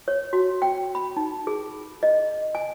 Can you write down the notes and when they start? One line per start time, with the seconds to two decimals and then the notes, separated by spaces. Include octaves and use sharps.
0.08 C#5
0.33 F#4
0.62 G5
0.95 B5
1.17 D#4
1.47 G#4
2.03 D#5
2.55 G#5